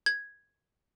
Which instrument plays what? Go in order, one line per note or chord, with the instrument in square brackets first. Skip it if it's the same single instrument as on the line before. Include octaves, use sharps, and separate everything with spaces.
[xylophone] G#6